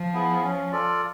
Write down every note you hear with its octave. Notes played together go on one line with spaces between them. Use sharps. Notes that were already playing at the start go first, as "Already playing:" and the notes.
Already playing: F3
B3 E4 G#4
C#4
F4 A4 D5